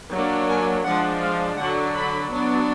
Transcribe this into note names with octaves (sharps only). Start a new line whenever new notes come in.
F#3 A#3 D4
G#5
F3 G#3 D4 F#5
F5
D3 F#3 D4 F#5
B5
F#3 B3 D4